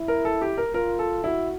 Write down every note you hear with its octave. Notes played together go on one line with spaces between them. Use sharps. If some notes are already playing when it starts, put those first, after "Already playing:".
Already playing: E4
A#4
A4
G4
A#4
F4 A#4
A4
E4 F#4